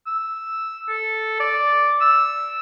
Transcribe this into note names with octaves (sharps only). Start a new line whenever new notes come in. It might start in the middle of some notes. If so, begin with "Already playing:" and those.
E6
A4
D5
E6